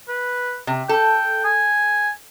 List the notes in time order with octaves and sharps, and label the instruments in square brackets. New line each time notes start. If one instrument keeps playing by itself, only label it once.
[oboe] B4
[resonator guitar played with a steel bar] C3
[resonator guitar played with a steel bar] A4 [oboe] G5
[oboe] G#5